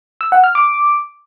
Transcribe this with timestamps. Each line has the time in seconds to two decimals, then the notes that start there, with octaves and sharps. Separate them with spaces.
0.21 E6
0.32 F#5
0.44 F6
0.55 D6